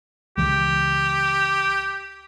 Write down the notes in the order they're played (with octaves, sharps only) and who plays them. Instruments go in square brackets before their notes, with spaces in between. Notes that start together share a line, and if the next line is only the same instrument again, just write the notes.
[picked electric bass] C#2 E3 G#3 [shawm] G4